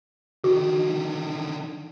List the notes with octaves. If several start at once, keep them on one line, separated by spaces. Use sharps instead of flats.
D3 D#3 F#4